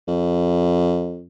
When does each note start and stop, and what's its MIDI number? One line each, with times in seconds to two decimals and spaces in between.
0.08 1.27 41